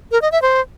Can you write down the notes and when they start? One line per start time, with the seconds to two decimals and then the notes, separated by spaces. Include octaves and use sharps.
0.12 A#4
0.22 D#5
0.32 E5
0.42 C5